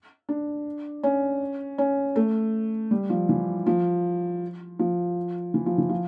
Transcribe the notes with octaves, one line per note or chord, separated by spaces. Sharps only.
D4
C#4
C#4
A3
G3
F3
E3
F3
F3
E3
F3
E3
F3